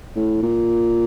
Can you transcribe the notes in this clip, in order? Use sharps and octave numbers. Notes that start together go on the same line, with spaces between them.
A2
A#2